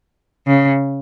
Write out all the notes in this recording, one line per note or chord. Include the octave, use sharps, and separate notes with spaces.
C#3